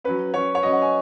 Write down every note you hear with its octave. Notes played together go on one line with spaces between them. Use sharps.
F#3 C#4 B4
F#3 C#4 C#5
C#5
F#3 C#4 D#5
F#5
G#5